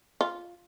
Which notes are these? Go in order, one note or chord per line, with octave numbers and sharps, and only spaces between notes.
F4